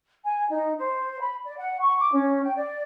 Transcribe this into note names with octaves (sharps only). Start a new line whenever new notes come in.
G#5
D#4
C5
B5
D5
F#5
C#6
D6
C#4
G5
D5